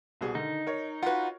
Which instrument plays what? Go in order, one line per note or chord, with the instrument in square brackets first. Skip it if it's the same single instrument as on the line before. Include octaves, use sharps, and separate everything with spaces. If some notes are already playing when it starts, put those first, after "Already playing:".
[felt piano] C2 B2 G#4
[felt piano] D3 D#3 [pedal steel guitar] D#4
[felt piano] A#4 C#5
[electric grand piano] F4 F#4 [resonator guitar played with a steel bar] B4 F#5